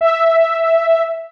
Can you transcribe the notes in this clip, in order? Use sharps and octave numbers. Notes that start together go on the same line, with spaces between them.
E5